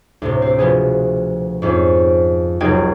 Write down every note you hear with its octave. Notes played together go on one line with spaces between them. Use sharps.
D2 A2 C3
C4 G4
B2 F3 B3 G#4
F2 G#2 C4 C#4
F1 C#2 F#3 D#4 G5 G#6